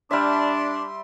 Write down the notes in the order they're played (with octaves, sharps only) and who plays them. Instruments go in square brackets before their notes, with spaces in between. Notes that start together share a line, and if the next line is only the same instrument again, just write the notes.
[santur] G3 E5 [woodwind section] D4 [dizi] C6